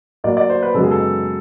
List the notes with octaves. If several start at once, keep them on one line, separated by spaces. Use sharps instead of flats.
A2 F#3 A#3 D5
D5
C5
B4
F#2 C#3 E3 G#3 B3 A4
G#4
A4